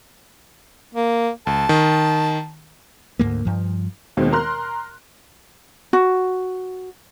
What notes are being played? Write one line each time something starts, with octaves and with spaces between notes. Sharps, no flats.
A#3
C#2 A5
D#3
D2 G#2 G3 A#3
G2 F3
D#2 B2 D#3 G#3 C4
A#4 A#5 C6 F6 F#6
F#4